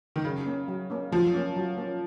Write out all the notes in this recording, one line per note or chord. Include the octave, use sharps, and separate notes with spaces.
D#3
C#3 F#3
A#3 C#4
F#3
A#3 C#4
F3 F#3
A#3 C#4
F#3
A#3 C#4